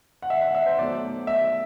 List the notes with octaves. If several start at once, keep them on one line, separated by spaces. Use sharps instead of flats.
F#5
E5
F#5
E5
C5
B2 F#3 A3 D5
E5